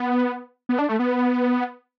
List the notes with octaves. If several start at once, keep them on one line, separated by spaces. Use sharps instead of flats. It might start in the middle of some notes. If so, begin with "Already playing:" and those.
Already playing: B3
B3
D4
A3
B3